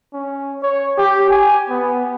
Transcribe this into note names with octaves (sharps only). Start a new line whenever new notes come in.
C#4
C#5
G4
G#5
B3